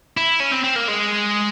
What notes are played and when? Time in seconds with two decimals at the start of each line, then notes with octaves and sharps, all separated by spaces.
0.17 E4
0.40 C#4
0.52 C4
0.64 C4
0.76 A#3
0.88 G#3